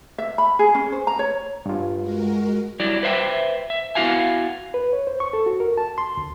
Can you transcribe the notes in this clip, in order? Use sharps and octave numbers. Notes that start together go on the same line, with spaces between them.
E5
B5
G#4
C#4
C5
A#5
C#5
G2 F4
G#3 F#4 A#4
F#3 G3 E4 D5
B4 C5 E5 F5 G5
E5
B3 E4 F#4 F5 G#5
B4
C#5
C5
C#6
A4
F#4
A#4
A5
C6
D2